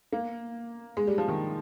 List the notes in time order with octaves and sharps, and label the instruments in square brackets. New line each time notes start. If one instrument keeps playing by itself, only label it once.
[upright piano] A#3
G#3
G3
F3
D#3